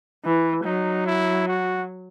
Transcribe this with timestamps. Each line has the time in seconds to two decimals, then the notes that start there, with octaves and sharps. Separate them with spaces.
0.25 E3
0.65 F#3 D#4
1.06 E4
1.47 F#4